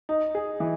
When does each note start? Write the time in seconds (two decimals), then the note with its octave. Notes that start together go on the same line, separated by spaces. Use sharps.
0.09 D#4
0.35 G#4
0.60 E3